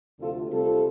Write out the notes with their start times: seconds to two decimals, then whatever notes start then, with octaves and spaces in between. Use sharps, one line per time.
0.18 D2 C3 F3 A3 F4 A4
0.51 C3 G3 C4 F4 A4